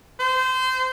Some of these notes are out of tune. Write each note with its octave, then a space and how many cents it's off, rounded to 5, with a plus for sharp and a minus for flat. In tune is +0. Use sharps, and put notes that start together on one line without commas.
C5 -25